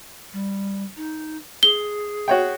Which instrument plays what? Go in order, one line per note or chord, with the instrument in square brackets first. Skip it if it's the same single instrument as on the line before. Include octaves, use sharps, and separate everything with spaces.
[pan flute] G3
D#4
[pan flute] G#4 [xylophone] G7
[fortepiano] F#4 C#5 G5